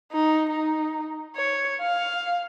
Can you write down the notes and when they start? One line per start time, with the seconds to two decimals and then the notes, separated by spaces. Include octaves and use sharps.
0.12 D#4
0.49 D#4
1.36 C#5
1.82 F5